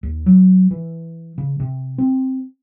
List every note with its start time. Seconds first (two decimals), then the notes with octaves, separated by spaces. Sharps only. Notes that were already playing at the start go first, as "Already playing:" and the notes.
0.03 D#2
0.26 F#3
0.71 E3
1.38 C#3
1.60 C3
1.98 C4